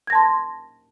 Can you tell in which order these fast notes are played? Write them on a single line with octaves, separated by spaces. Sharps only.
G#6 A#6 A5 C6